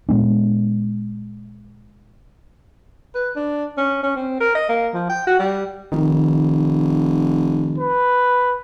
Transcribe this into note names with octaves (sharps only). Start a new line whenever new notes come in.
A#2 G#3 B3 D4
B4
D4
C#4
C#4
C4
A#4
D#5
A#3
F3
G5
F#4
G3
F1 D#3
B4